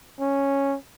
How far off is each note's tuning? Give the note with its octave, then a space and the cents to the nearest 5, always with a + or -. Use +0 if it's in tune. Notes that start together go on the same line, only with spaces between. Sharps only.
C#4 -5